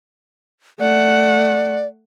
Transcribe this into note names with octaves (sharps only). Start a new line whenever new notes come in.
A3 D5 F#5